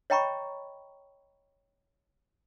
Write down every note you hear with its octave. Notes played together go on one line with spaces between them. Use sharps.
C#5 D#5 G5 A#5 B5 C#6